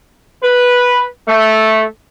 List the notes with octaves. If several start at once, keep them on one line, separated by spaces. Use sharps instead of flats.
B4
A3